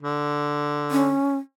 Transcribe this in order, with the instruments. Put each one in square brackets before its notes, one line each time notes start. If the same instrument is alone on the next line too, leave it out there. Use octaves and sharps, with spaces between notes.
[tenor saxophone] D3
[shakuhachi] C#4